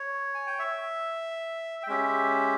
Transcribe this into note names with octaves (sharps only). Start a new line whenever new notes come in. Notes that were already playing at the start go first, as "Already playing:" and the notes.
Already playing: C#5
G#5
G5
E5
G5
G#3 C#4 G4 E5